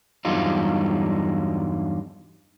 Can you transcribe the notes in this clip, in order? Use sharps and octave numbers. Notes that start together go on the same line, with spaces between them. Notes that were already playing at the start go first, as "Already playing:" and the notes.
E2 G2 F#3 G3 D#4 F4